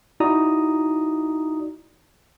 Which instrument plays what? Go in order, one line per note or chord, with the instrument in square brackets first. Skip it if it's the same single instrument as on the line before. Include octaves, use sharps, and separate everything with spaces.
[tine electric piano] D#4 E4 F#4 D5 A#5 D#6